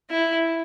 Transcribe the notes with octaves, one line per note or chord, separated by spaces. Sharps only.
E4